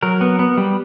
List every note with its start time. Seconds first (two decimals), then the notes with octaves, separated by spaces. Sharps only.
0.03 F#3 A#4
0.21 B3
0.39 B3
0.57 G3